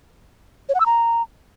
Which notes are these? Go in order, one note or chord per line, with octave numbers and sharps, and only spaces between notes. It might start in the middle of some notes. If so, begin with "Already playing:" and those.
C#5
F#5
E6
A#5